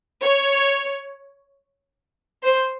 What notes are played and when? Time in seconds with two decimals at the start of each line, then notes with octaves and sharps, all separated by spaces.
0.24 C#5
2.44 C5